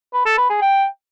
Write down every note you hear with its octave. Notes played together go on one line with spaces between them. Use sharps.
B4
A4
B4
G#4
G5